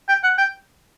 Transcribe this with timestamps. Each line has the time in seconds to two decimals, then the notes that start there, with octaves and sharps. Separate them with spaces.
0.09 G5
0.23 F#5
0.38 G5